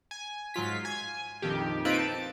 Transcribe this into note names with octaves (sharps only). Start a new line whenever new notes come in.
G#5
G#2 F#3 F4 B6
G#5
A#1 F2 D#3 G4
A#3 C4 D#4 F4 B4 D7
A5